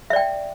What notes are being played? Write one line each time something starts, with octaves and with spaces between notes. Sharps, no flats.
D5 E5 G5